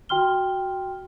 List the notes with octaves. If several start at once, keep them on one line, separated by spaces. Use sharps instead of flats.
F#4 G5 C6 F6 G7